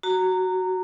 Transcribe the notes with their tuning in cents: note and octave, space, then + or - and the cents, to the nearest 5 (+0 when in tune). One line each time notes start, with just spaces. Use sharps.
F#4 +5 A#5 -15